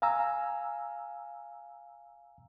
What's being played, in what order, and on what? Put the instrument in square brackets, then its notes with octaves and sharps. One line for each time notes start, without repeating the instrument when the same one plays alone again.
[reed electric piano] F5 G#5 A#5 E6